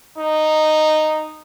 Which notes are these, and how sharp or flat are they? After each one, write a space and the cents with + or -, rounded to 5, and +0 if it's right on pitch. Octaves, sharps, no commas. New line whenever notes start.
D#4 -10